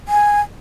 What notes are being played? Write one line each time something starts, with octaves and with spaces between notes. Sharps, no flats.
G#5